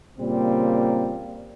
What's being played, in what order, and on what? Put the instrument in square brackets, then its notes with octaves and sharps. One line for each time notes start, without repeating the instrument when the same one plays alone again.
[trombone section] A#2 C#3 G3 A#3 C4